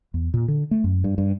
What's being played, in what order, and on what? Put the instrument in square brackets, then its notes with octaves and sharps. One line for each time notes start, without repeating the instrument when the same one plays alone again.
[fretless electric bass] E2
A#2
D3
A3
F#2
G2
G2